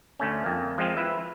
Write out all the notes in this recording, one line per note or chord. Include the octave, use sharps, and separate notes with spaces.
D2 A3 C#4
F2 A#3
F3 G#3 C4 F4
E4 B4 E5